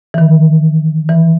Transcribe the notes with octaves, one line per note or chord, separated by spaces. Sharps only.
E3
D#3
E3